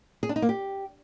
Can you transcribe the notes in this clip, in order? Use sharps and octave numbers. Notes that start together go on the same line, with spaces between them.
G#4
D4
D#4
A#3
G4